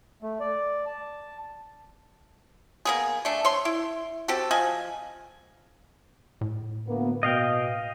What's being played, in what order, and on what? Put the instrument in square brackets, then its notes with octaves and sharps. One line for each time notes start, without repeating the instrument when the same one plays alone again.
[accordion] A3
D5
A5
[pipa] A#3 B3 G#4
A3 D4
C#5 C6
E4
C4 F#4 G4 A4
F3 D#5 G#5
[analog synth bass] A2
[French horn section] D2 A#3 B3
[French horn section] B2 [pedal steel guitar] D#5 F5 G5